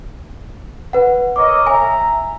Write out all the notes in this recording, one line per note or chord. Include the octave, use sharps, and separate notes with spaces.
B4 F#5
A#4 C#5 D#5 D6
E5 G#5 A#5